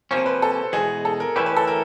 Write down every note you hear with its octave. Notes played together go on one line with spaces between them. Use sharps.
C3 F3 A#3 C#4 C5
B4
A4
E2 B2 G#3 G#4
A4
A#4
E3 A3 C#4 E4 G4 B4
B4
A4
A#4